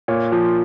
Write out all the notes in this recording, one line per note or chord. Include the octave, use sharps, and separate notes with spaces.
A#2 C#5
F3